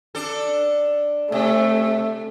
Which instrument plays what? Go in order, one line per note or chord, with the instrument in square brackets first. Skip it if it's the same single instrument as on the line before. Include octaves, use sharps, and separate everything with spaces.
[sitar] D4 A4
[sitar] C3 [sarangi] A3